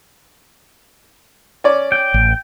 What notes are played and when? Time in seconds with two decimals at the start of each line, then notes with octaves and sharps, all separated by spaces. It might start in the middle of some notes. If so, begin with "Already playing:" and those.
1.64 C#4 D5
1.92 G5
2.14 A1